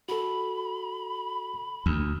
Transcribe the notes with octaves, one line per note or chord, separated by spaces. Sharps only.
F#4 A4 B5
D2